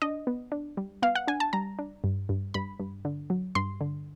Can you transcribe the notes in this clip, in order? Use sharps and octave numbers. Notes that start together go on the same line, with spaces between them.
D4 D#5
B3
D4
G3
B3 F5
F#5
D4 G#5
A5
G3 A#5
D4
G2
G2
G2 B5
G2
D3
F#3
G2 C6
D3